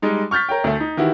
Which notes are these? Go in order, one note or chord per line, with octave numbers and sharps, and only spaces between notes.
G3 G#3 D#4
C#6 F6 G6 A6 B6
A#4 C#5 G5
D2 A3
D#4
D#3 E3 E4 F#4 G4